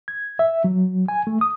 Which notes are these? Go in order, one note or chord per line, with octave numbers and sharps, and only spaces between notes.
G#6
E5
F#3
G#5
A3
D#6